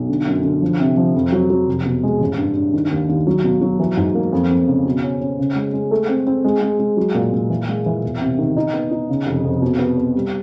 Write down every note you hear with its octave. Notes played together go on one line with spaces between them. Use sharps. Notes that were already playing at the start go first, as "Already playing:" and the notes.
Already playing: B1
D3
F#2
D3
F3
C3
F3
F2
F#3
F#3
F1
B2
G#3
A1
G2
G2
D#3
D#2
D#2
F#3
B2
F#3
E3
G#2
A#3
F2
F2
C#3
B2
C#4
C#4
C#3
G#3
G#3
A3
C4
C4
G#3
G#3
G#3
F#3
A#2
A#2
E3
G#3
E3
E1
C3
D#3
D#4
B3
D#4
C#3
F1
F2
B2
B3
B3
G3